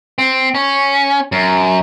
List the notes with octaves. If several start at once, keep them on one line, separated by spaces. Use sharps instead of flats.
C4
C#4
F#2